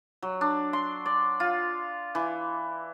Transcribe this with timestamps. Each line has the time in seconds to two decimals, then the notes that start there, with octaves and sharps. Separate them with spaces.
0.22 F#3
0.41 D4
0.73 C6
1.06 D5
1.40 F4
2.15 E3